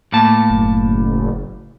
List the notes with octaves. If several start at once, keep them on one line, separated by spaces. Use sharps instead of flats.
A2 A#3 A5
F#1